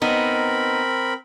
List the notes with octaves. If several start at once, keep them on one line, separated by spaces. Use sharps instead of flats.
B3 C4 D#4 A#4 B5